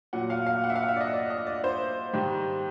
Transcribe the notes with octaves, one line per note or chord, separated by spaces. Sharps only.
A#2 F#3 F#5
F5
F5
F#5
E5
F5
E5
D5
D#5
D5
D#5
D5
C5
G#2 D#3 G3